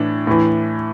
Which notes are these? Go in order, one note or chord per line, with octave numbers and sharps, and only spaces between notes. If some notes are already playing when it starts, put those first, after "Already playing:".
Already playing: A2 E3 D4
A2 E3